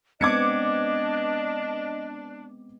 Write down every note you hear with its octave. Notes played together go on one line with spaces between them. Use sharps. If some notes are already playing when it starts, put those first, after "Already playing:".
G#3 B3 C4 D4 D#5 D6 G#6 C#7